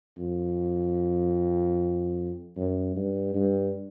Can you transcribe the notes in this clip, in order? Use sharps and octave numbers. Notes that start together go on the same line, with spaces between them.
F2
F#2
G2
G2